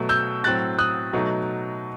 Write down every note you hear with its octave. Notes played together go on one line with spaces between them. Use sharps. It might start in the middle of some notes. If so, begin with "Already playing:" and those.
Already playing: B2 F#3 A3
E6 G6
A2 F#3 C4 F#6 A6
D#6 F#6
B2 F#3 A3 D#4